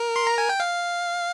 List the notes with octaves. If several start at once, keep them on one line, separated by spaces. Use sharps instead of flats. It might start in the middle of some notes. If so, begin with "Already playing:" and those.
Already playing: A#4
C6
A#5
G#5
G5
F5